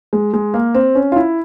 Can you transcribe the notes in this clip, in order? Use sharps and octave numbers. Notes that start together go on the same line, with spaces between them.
G#3
G#3
A#3
C4
C#4
F4
E4